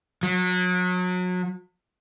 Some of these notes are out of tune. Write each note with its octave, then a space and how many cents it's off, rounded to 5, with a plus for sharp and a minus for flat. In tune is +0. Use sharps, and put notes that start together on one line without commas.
F#3 -35